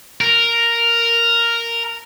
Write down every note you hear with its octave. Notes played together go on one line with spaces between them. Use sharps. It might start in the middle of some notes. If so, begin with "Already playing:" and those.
A#4